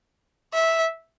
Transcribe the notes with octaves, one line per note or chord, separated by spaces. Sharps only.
E5